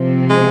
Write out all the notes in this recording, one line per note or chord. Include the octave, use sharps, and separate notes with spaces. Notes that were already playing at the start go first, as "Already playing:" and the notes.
Already playing: C3 F3 C4
G#3